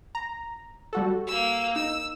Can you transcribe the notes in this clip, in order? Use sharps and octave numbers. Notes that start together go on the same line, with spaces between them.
A#5
G3 F#4 A4
A#3 E6
D#4 E6